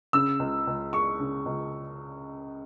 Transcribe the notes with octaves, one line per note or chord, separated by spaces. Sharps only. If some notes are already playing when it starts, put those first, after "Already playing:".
C#3 E6
C#2
C#2
G#3 C#6
C#3
C#2